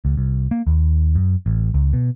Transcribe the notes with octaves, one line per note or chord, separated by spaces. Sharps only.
C#2
C2
A#3
D#2
F#2
A1
C#2
B2